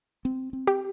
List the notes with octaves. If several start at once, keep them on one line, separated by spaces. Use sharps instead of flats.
C4
C4
G4